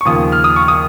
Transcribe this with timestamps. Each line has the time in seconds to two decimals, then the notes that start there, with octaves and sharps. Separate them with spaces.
0.01 C#6
0.05 D#2 C#3 F3 D#6
0.32 F6
0.44 D#6
0.56 C#6
0.68 D#6